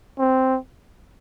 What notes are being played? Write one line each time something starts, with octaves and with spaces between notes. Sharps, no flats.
C4